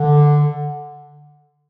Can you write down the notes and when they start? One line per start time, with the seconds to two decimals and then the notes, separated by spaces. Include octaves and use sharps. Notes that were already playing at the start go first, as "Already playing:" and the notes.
Already playing: D3